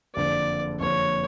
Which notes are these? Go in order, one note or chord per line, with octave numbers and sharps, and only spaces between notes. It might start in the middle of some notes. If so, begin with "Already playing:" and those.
F#1 F2 D3 D5
F#1 F2 D3 C#5